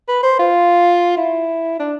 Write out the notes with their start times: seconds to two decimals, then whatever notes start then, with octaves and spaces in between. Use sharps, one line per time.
0.08 B4
0.23 C5
0.39 F4
1.17 E4
1.79 D4